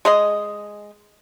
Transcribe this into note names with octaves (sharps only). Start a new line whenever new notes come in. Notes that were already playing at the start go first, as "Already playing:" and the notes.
G#3 G#4 D#5